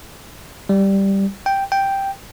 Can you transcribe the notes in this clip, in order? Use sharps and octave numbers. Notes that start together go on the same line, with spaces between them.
G3
G5
G5